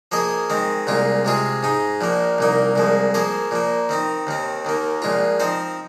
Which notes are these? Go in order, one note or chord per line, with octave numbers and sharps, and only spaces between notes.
F3 A#3 G#4 D#5
D#3 G#3 C4
C2 A#2 G#3 F4
C3 G#3 F4 G#4
G#2 G#3 D#4
A#1 A#2 F3 A#3
C2 A#2 A#3 D#4
C2 A#2 F3 G#3
F3 A#3 G#4 C5
A#2 F3 A#3
D#3 C4 D#4
D#2 D#3 C4
D#2 D#3 A#3
A#1 A#2 G#3 F4
F3 C4 D#4 C5